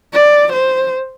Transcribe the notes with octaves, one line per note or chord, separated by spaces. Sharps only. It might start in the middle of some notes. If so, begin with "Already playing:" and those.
D5
C5